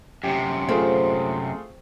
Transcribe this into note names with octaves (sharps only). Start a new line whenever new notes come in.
F#2 C3 G4
A3 C4 F4 G#4